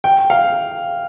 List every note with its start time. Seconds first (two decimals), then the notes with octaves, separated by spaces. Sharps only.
0.04 G5
0.30 F5